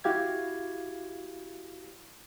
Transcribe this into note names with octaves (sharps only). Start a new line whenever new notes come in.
E4 F#4 G4 F5 G#6